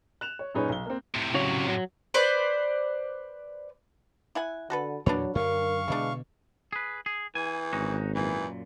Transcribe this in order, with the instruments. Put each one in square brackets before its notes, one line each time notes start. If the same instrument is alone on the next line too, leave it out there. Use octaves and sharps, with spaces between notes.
[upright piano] F#6 E7 F7
C#5
F#2 A#2 D#4 G#4 B4 C#5
B1 G7
A#3 C4
[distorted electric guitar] A2 C3
[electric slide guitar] C#3 F#3 C#5
F#3
[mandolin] B4 C5 D5
[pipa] E4 F#5 G#5
[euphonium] D3 [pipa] F#4 A4 B4
[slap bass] E2 A#2 A#3 [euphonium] F#3 [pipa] D4 B4 C#5
[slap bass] F#2 D3 [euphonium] A#4 [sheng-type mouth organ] F5 C#6
[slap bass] B2 D3 [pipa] E3 D4 [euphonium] G#3
[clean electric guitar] G#4 B4
G#4
[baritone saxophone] E3 [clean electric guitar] G#5
[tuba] G#1 [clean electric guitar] C#4 D#4 F#4
[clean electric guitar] F#2 A#2 [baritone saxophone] E3